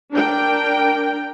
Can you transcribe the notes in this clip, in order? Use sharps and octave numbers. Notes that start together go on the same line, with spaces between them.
D4 A#4 G5